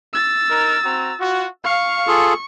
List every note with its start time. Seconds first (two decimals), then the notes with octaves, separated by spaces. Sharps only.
0.13 E6 A6
0.50 D#4 A#4
0.85 C4 F#4 A#5
1.19 F4 F#4
1.64 F5 C#6
2.07 F4 G#4 A4